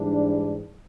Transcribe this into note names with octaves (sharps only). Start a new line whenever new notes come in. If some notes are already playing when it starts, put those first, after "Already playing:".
Already playing: G#2 E3 G3 D4